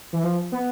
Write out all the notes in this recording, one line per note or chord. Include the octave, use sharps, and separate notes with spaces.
E3
F3
B3